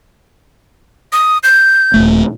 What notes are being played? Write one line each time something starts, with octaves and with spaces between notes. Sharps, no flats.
D#6
G6
D#1 G#1 A3